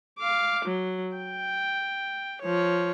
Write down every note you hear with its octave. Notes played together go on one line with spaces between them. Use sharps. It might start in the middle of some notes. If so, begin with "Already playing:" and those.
F5 D6
F#3
G5
F3 C#5